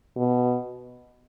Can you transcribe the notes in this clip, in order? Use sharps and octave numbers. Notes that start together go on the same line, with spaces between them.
B2